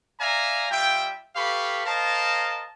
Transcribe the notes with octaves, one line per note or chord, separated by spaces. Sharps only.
D5 E5 F5 G#5 A#5
G3 F4 E5 G5
G4 A4 B4 F5 B5 C#6
A#4 C5 D#5 F5 A5